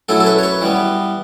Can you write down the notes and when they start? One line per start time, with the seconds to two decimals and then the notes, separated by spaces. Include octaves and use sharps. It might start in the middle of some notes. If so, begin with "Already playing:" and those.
0.09 F#3 C#4 E4 A4
0.20 A4
0.26 B4
0.39 C#5
0.43 B4
0.61 E3 G3 B3